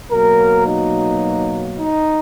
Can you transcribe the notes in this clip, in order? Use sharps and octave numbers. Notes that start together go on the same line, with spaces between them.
B2 F#3 A#3 A#4
D#4
D#4